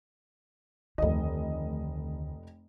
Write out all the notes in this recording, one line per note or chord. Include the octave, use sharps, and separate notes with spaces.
F1 D2 D#3 D#5